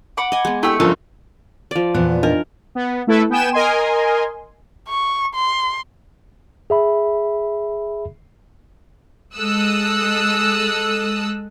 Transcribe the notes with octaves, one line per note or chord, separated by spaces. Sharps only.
F#5 B5 D6
D#5 G#5
G#3 B3
A3 E4 G4 E6
F#1 G2 F3 F4 A#4 D#5
F3 D5
E2 A#2 B3 C5
D4 D#4 A#4 D#5
B3
A3 E4 A4 B4
B3 G5 G#5 E7
A#4 D#5 G#5 C6
C#6
C6
G#4 E5 B5
G#3 A4 D#6 E6 F#6